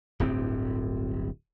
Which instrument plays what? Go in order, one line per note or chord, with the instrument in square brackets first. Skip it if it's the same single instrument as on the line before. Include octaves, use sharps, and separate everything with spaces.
[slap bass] D1 G1 A2 C4